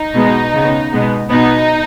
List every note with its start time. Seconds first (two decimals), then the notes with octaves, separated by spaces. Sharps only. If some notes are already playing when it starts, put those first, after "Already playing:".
Already playing: D#4
0.14 B2 G#3 B3
0.53 C#3 B3
0.92 B2 G#3 B3
1.30 B2 B3 D#4